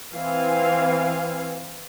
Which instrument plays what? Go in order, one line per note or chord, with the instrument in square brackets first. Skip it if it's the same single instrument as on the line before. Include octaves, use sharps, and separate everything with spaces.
[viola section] E3 C4 F5 G#5